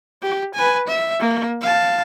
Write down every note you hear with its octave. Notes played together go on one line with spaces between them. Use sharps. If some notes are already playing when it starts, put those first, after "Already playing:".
G4
B4 G#5
E5
A#3
F5 A5